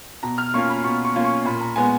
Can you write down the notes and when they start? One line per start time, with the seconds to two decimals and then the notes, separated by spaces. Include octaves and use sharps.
0.23 B2 A#5
0.38 F6
0.54 A#3 C#4 F4 C#6
0.69 B5
0.84 B2 C#6
1.04 C#6
1.15 A#3 C#4 F4
1.24 C#6
1.45 A#2 B5
1.61 A#5
1.76 G#3 B3 G#5